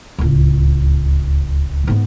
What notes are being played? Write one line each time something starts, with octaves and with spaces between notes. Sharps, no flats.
D1 C#2
G#2 B3